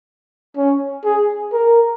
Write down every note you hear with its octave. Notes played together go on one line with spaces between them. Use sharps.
C#4
G#4
A#4